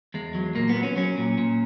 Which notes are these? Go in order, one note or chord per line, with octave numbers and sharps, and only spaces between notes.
E2 G#3
F#3
A#2 A#3
B3
F#3
C#4
F#3 C#4
A#2
A#2